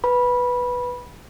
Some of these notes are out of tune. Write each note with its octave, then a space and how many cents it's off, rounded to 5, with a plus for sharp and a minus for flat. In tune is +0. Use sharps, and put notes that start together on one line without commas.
B4 +0 B5 -15